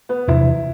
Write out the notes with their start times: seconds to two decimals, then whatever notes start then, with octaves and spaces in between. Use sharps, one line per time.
0.09 B3
0.28 E2 C3 E3 E4